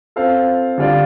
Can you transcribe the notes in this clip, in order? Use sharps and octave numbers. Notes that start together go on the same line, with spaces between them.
C4 F4 A4 F5
D3 G3 F4 D5